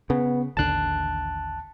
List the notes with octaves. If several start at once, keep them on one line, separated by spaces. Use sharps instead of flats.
C#3 B3
A1 D#2 D3 A5 F#6